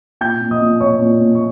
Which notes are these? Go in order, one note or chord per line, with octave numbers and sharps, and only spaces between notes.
A#2 G5 G6
A#2
D#5 D#6
A#2
A#2 C#5 C#6
A#2
A#2
C#6